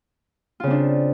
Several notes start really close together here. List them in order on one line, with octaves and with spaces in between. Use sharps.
F4 C#3 C4 D4